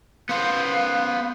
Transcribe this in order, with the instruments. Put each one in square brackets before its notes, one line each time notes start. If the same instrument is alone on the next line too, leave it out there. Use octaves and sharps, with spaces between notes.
[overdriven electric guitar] B3 C5 [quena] F5